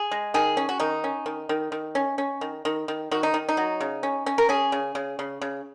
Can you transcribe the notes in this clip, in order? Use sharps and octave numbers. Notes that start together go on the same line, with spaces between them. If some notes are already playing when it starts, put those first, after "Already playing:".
Already playing: G#4
G#3
D#3 G#4
C#4
F#4
D#3 D#4
C#4
D#3
D#3
D#3
C#4
C#4
D#3
D#3
D#3
D#3 F#4
D#4
D#3
D#4
F#3
C#3
C#4
C#4
A#4
C#4 G#4
C#3
C#3
C#3
C#3